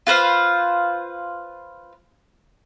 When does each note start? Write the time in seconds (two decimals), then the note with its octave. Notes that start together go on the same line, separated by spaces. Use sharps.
0.07 F4 B4 C5 F5